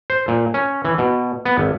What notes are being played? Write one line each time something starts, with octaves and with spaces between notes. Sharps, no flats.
C5
A#2
C#4
E3
B2
B3
G#1